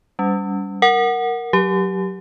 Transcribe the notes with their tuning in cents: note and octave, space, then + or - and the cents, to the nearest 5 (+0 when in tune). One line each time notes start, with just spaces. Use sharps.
G3 +0 C#4 +35
A#4 +0 F#5 +0
F#3 +0 G4 +0